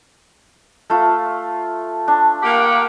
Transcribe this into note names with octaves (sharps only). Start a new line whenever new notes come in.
A3 F4
D4
A#3 G4 F#5